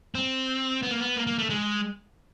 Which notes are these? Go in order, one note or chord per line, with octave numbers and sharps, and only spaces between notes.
C4
B3
A#3
B3
A#3
A#3
A3
G#3